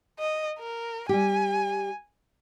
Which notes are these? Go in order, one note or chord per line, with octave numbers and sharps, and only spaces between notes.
D#5
A#4
G3 G4 G#5